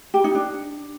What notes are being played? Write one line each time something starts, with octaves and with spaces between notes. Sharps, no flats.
G4
D#4
D4